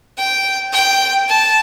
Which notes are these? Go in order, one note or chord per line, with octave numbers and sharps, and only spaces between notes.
G5
G5
A5